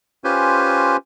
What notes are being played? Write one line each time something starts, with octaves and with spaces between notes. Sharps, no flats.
C#4 F4 G4 B4 C5 G#5